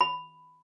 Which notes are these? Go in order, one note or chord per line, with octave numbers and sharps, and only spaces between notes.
B5